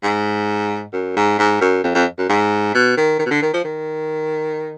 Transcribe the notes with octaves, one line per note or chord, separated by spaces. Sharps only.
G#2
F#2
G#2
G#2
F#2
F2
F2
F#2
G#2
B2
D#3
D#3
B2
D3
D#3
F3
D#3